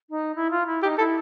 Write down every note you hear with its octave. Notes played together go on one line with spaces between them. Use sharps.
D#4
E4
F4
E4
D#4 G4
E4 A4